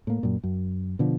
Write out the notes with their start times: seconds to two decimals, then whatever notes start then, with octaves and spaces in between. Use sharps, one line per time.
0.07 A2 A#3
0.23 F#2 A#2
0.44 F#2
0.99 B2 D3 F3